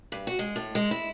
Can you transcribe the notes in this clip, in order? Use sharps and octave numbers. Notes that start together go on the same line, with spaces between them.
G2
F#4
G#3
A2
G#3
E4